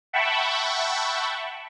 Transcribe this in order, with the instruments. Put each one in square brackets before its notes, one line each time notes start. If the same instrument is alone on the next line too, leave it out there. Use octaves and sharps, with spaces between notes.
[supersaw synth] E5 F#5 G5 A5 B5 C#6